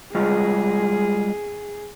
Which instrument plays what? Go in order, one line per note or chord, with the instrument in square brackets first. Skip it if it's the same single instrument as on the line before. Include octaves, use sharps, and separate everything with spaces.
[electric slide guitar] G3 G#3 F4 [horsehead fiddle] G#4